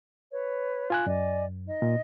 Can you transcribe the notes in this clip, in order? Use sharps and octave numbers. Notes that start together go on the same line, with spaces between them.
B4 C#5
F4 G#5 F#6
F#2 D5 D#5 G#5
D#4 D#5
A#2